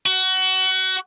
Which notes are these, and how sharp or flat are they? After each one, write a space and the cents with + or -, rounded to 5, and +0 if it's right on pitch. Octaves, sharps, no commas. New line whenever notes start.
F#4 +25